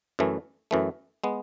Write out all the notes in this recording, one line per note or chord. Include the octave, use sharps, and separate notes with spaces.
F#2 E3 A3
F#2 E3 A3
G#3 B3